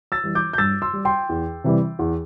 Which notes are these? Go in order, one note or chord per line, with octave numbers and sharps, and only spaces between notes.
E6 A6
E3 G3
D6 G6
G6
G2 E6 A6
C6 E6
G3
G5 C6
E2
C3 E3 G3
E2